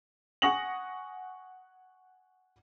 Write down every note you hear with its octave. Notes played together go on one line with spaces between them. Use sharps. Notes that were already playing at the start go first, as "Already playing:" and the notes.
F#5 G#5 C#6 D#6 A#6 F#7